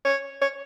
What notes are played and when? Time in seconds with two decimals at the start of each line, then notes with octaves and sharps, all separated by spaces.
0.05 C#5
0.42 C#5